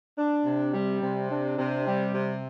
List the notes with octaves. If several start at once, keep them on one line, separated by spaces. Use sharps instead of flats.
D4
C3
G3
C3
D4
C3
G3
C3